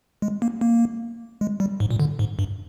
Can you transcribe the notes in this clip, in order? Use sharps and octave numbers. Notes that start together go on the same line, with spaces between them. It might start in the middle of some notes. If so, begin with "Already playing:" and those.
G#3
A#3
A#3
G#3
G3
G#2
A#2
D3
G#2
G2